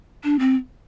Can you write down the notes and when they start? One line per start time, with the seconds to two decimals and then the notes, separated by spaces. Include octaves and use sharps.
0.24 D4
0.39 C4